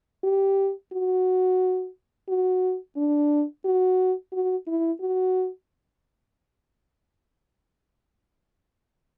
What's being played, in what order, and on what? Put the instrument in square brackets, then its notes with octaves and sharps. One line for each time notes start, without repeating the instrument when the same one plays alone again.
[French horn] G4
F#4
F#4
D4
F#4
F#4
E4
F#4